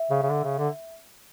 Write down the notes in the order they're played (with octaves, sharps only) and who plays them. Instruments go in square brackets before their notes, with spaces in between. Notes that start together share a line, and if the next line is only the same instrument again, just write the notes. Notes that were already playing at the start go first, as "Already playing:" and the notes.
Already playing: [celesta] E5
[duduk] C#3
C#3
D3
C#3
D3